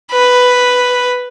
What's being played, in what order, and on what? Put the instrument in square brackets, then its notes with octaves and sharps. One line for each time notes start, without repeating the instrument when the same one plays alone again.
[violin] B4